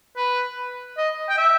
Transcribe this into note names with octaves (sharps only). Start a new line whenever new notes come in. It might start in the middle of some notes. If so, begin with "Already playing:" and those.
B4
D#5
G5
E5